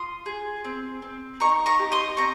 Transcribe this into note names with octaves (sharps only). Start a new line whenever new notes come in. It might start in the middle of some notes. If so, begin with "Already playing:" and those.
Already playing: F4 C6 D#6
G#4
C4
C4
D#4 A#5 C#6
A#5 C#6
G4
C6 D#6
C4 A#5 C#6